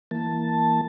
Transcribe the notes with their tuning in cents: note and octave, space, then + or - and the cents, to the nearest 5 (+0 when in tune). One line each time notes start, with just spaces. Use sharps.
E3 +0 A#3 +0 A5 +0